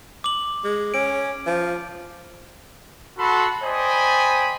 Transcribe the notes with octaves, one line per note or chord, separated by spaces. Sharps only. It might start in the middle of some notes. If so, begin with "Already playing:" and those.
D6 F#7
G#3
C#4 D7
F3
F#4 A4 F#5 A5 B5 C6
C5 D5 D#5 G5 G#5 B5